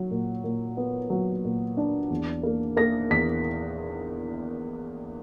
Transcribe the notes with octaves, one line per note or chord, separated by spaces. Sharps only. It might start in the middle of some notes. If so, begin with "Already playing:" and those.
Already playing: F#3
A#2
A#2
B3
F#3
A#2
D4
E2
A#3
A#3 A#6
E2 B6